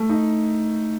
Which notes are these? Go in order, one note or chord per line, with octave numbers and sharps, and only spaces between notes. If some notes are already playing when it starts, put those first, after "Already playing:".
Already playing: A3
D#4